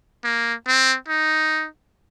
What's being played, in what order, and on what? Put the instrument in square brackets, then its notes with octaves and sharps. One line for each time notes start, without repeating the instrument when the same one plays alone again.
[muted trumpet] A#3
C4
D#4